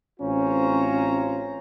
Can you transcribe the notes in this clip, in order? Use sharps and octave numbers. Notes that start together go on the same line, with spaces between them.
A1 C4 C#4 F4 C5 A#5